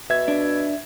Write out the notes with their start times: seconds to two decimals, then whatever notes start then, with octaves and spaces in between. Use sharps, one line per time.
0.10 B2 E5 G#6
0.28 D4